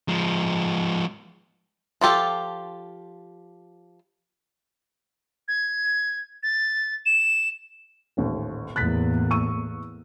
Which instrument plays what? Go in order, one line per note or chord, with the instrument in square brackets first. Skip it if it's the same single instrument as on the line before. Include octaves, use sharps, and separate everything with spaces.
[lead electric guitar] F3 G#3
[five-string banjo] F3 F4 G4 A4
[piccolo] G#6
A6
E7
[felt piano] D#1 A1 D#2
[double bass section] E2 A2 A#3 [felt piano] F#6 A6 B6
[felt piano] C#6 E6 D#7